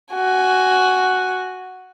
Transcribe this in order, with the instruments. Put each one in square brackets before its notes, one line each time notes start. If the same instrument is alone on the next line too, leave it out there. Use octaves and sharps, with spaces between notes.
[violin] F#4 G#5